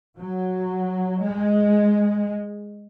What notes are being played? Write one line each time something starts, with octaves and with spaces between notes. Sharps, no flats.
F#3
G#3